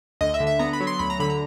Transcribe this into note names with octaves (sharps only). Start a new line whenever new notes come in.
D2 D#5
E5
D3
E5
B3 A#5
B5
F#3
C6
D2 B5
A#5
D3 B5
A#5